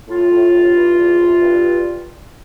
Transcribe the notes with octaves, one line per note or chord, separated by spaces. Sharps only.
A2 F4
A2
G2
E3
E2
C3
G2